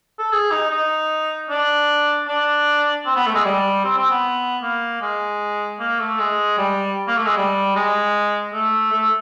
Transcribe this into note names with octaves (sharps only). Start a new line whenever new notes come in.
A4
G#4
D#4
D#4
D4
D4
C4
B3
A3
G#3
G3
C4
C4
B3
A#3
G#3
A#3
A3
G#3
G3
A#3
A3
G#3
G3
G#3
A3
A3